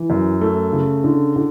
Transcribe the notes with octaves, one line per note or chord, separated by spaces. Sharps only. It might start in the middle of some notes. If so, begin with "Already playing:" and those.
Already playing: E3
F#2
A3
C#3
D3
D3